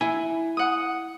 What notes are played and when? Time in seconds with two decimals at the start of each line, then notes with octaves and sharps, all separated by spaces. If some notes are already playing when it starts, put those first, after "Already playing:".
0.01 E4 G#5
0.57 F#5 D#6